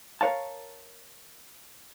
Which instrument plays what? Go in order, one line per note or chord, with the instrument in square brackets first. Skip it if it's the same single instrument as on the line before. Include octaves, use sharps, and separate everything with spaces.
[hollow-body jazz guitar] A#4 B4 C#5 F5 A5